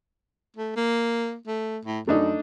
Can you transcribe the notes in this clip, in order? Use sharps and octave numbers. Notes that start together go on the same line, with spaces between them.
A3
A#3
A3
A2
F#2 A3 D4 D#4